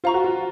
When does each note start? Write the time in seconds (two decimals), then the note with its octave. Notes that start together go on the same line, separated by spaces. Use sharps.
0.04 F4 C5 F5 A#5 C#6
0.14 F#4
0.24 F4